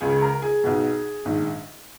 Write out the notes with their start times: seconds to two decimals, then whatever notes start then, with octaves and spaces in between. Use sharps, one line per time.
0.01 C#2 C#3 G#4
0.22 A#4
0.42 G#4
0.64 B1 B2
1.25 A#1 G#2 D#3